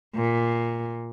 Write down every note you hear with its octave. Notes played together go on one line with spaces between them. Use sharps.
A#2